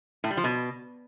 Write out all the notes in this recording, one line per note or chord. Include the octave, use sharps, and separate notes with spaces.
A2
G3
F3
B2